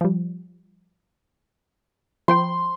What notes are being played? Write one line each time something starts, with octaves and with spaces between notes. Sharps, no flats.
F3 G3
F3 C5 G5 C6